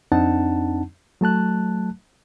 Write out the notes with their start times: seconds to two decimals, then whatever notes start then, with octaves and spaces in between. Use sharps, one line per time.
0.12 F2 C4 D4 D#4 F#5 A5
1.21 F#3 A3 A5 F#6